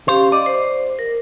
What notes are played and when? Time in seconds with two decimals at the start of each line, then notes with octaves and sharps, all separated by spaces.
0.08 C#4 G4 C5 F5
0.32 D5 D#5
0.46 C5
0.99 A#4